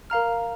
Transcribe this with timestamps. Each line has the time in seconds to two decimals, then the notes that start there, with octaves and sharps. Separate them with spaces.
0.10 A#4 F5 A#5 F6